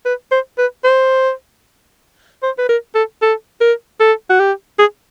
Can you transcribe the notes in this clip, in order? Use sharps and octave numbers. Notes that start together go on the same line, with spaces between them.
B4
C5
B4
C5
C5
B4
A#4
A4
A4
A#4
A4
F#4
G4
G#4